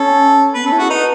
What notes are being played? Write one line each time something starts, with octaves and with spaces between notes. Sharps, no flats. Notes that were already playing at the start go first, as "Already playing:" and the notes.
Already playing: C#4 A4
B3 B4
C#4
A4
E4
F#4 G#4
D#4 B4